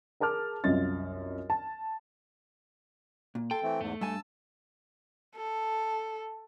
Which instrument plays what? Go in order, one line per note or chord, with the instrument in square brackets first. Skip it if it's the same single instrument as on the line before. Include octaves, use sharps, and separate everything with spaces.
[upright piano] G#4 A#4 A5 D6 F6
C2 F#2 F4 D#5 A6
A5
[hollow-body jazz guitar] A#2
[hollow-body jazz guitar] A4 [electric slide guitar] G5 [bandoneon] C6
[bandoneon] E3 A3 C4
[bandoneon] E2 G#2 [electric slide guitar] A3
[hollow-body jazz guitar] G2 G#5 [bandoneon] A5 E6
[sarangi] A4